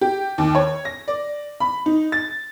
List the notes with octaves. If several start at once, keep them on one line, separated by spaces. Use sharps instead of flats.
G4
D#2
C#5
A#6
D5
B5
D#4
A6